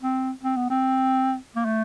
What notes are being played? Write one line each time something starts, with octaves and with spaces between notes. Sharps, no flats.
C4
C4
B3
C4
A#3
A3